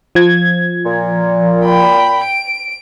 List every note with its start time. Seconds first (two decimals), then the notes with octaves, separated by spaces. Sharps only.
0.15 F3 G#6
0.86 A#2
1.64 G5 B5
2.24 D7